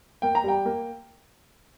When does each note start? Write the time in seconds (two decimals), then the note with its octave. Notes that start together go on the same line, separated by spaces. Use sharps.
0.22 A#3 G5
0.35 A#5
0.44 G3 G5
0.65 A#3